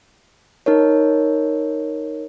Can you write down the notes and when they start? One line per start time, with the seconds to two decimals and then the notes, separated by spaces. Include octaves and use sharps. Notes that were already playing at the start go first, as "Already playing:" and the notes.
0.66 D#4 A#4 C#5